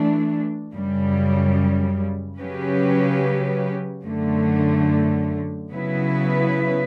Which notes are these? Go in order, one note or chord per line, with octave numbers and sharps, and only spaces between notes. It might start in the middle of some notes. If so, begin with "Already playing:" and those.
Already playing: E3 A3 D4
F#2 C#3 G3
C#3 F#3 C#4 G4 B4
F#2 D3 A3
C#3 F#3 B3 E4 B4